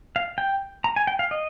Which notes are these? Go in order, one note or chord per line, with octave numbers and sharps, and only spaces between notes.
F5
G5
A#5
G#5
G5
F5
D#5